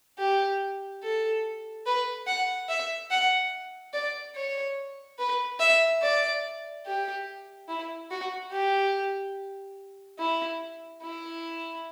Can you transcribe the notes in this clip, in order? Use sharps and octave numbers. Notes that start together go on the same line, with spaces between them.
G4
A4
B4
F#5
E5
F#5
D5
C#5
B4
E5
D5
G4
E4
F#4
G4
E4
E4